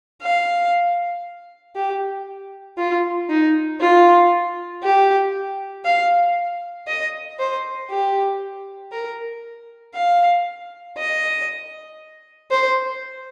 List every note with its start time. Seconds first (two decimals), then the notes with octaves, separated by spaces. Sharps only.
0.22 F5
1.76 G4
2.78 F4
3.29 D#4
3.81 F4
4.83 G4
5.85 F5
6.87 D#5
7.39 C5
7.90 G4
8.92 A#4
9.95 F5
10.98 D#5
12.51 C5